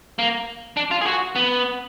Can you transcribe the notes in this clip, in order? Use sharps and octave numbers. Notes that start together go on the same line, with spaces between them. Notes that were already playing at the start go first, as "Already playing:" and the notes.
A#3
D4
F4
G#4
F#4
B3